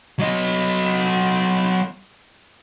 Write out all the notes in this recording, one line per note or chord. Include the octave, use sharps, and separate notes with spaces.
F#3 D#5